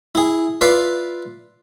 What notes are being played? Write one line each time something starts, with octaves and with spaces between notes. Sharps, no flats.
E4 G#4
F4 B4 D5 E5 C6